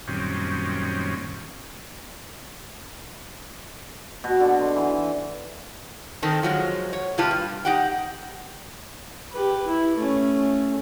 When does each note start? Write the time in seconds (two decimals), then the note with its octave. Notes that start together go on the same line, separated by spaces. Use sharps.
0.08 F#2 A#2 D#3 G3 C4 C#4
4.24 B2
4.40 D3
4.60 C6
4.75 E3
6.22 D#3 C4 A4
6.43 F3 F#3 G#3
6.93 C#5
7.18 G2 C3 F4 G4 B4 A5
7.31 G2
7.65 D#4 G4 F#5 G5
9.32 G4 B4
9.68 E4
9.97 A3 C#4